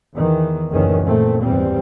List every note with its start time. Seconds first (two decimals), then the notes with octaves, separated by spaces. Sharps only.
0.14 E2 D#3 E3
0.71 F#1 D2 A#2 D#3 E3 C#4
1.05 A#2 A3 C4
1.41 G#1 E2 E3 G3 C4